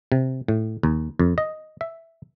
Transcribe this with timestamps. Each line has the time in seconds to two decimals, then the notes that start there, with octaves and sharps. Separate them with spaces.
0.12 C3
0.48 A2
0.83 D#2
1.19 F2
1.38 D#5
1.81 E5